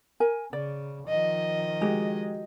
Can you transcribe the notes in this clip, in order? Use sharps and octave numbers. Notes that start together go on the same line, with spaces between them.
A#4 G#5
C#3 D5
D#3 F3 D#5
G#3 F#4 G4